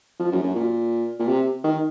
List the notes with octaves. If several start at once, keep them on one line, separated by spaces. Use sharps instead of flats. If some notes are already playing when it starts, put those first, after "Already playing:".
F3
F#2
F#2
A#2
A#2
C3
D#3